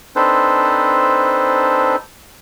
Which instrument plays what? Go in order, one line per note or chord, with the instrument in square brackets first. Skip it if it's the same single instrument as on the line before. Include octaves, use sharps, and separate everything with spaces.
[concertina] C4 D4 D#4 A4 B4 C5